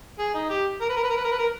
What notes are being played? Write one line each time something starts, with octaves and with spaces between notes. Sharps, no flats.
G#4
D#4
G4
A#4
B4
A#4
B4
A#4
B4
A#4
B4
A#4